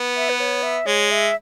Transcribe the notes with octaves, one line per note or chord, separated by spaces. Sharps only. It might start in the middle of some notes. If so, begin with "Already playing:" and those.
Already playing: B3
E5
B4
C#5
E5
G#3 C#5
E5